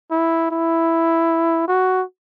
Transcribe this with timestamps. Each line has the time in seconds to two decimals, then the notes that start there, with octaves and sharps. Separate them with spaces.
0.11 E4
0.51 E4
1.68 F#4